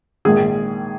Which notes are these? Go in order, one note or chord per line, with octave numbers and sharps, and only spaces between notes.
A#1 G#2 D#3 G#4